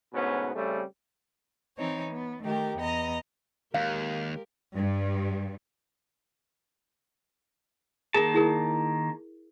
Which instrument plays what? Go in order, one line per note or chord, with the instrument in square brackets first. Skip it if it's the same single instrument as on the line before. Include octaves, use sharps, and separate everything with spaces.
[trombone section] D2 G#2 B2 B3 C#4
C#3 G3 A3 C4 C#4
[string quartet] E3 C4 D#4 C#5
B3
D#3 A3 G4 A#4
E2 B3 D#5 A#5
[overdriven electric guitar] D#2 [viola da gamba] G#3 G4 A#4 [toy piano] F5
[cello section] G2
[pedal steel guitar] D#3 A#3 A5 [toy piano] G#4 A#4
[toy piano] E4 G#4 A#4